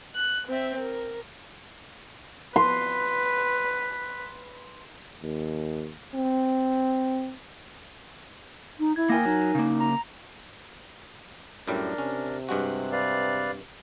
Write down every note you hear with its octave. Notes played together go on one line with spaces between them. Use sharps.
F#6
C4 E5
A#4
B4 C6
D#2
C4
D#4
E4 G#6
A#3 A#4 G5 G#5 A#6
F#3 D#4
C#3 A#3
A#5
F#2 A2 G3 D4 A#4
C3 C#4
G2 G#3 F#4 F#6
B4 D5 F5